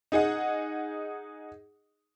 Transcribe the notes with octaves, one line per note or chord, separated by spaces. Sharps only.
D#4 G#4 D#5 F#5